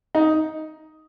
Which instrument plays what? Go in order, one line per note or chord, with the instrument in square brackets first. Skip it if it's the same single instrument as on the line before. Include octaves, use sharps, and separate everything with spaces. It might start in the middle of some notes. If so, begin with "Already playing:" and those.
[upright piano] D#4